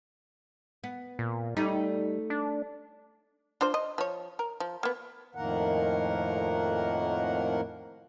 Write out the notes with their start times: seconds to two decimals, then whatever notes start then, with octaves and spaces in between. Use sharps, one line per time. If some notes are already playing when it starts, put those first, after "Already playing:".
0.84 B3
1.19 A#2
1.57 G3 A3 C#4 D#4
2.30 D4
3.61 D4 F4 C5
3.74 D#5
3.98 F3 C#5
4.39 A#4
4.60 F3
4.83 A#3 B3
5.35 F2 A2 D#3 A#3 A#4 F#5